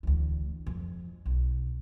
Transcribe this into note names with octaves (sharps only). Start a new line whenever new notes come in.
D2 E3
F2
B1